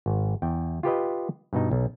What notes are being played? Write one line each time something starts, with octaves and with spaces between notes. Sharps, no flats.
G#1
E2 G5
F4 G4 B4 D#5
G2 B2 D#4
B1